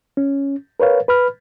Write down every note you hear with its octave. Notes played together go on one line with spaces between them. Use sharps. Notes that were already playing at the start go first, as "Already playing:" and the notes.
C#4
A#4 B4 C#5 F5
B4 B5 F6